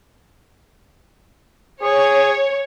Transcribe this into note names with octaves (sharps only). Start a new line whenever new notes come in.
G#4 C#5